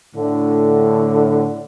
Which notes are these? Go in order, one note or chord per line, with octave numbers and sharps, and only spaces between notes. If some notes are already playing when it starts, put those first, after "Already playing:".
A2 D3